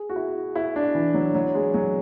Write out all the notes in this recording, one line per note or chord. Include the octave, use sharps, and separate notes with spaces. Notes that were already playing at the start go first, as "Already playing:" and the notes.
Already playing: G#4
F#4
E4
E4
D4
E3
F#3
F#3
G#3
F#3